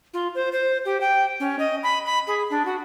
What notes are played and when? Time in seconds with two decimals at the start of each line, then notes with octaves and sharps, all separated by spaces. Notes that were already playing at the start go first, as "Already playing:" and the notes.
0.14 F4
0.35 C5
0.52 C5
0.85 G4
1.01 G5
1.40 C#4
1.59 D#5
1.83 B5
2.06 B5
2.27 G#4
2.50 D4
2.66 F#4